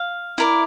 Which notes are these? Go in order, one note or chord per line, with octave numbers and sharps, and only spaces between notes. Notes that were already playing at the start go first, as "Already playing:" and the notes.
Already playing: F5
E4 A#4 D5